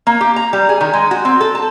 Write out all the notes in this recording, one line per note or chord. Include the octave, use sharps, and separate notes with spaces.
A#3
G4
A#5
G3
G#4
D#3
G#3
F#4
C4
A4
A5